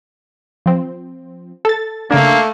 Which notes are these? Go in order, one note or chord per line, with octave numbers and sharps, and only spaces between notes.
F3 C4
A4 A6
C#3 A3 A#3 D4